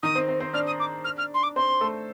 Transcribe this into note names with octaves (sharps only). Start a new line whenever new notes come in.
D#3 D#4 D#6
C4 C5
C4 C5
C4 C5
D4 D5 F6
D#6
D6
F6
F6
C6
D6
C4 C5 C6
A3 A4